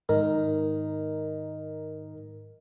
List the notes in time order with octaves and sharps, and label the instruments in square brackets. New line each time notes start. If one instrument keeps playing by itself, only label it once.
[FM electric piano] G#2 A#4 [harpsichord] D#3